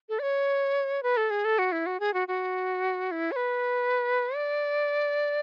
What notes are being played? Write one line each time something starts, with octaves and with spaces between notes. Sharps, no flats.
A4
D5
C#5
B4
A4
G#4
A4
F#4
E4
F#4
G#4
F#4
F#4
E4
C#5
B4
D5